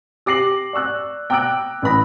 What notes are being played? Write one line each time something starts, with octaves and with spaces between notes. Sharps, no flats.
G4 D6 A#6 C7 F#7
D5 C#6 E6 F#6
G5 A#5 D6 E6 F#6 D7
A1 B4 B5 A#6